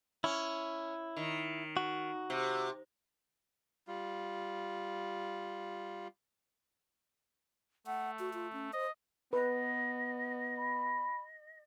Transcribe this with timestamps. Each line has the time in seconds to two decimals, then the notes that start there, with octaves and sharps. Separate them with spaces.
0.24 C#4 E4
1.17 D#3
1.77 F#4
2.30 C3
3.87 G3 F4
7.87 A3 F#5
8.19 F#4
8.34 F4
8.53 C#4
8.73 C5 D#5
9.33 B3 B4 D#5
10.57 B5